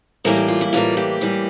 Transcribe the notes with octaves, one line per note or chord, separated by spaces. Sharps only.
A2 E3 G3 A#3 A#4
G4
F4
E4
A2 E3 G3 A#3 F4
G4
A2 E3 G3 A#3